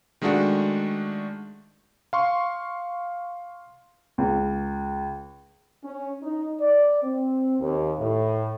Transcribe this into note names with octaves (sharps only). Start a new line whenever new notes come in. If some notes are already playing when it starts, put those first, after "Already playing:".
D#3 G#3 A3 D4 F#4
F5 C6 C#6
C#2
C#4
D#4
D5
C4
D#2
A2